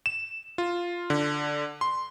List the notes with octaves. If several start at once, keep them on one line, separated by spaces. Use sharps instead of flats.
E7
F4
D3
C6